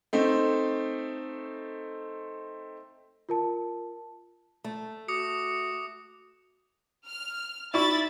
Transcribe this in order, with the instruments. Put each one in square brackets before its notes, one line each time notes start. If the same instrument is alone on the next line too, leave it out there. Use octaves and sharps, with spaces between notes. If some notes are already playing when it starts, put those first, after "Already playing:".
[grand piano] A3 C4 D#4
[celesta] F4 A#4 A5
[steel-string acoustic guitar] A3
[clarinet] F#4 [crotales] D6 D#6 C#7
[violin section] F6
[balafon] D#4 F#4 [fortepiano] E4 D5 C#6 [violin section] E5 B5 A6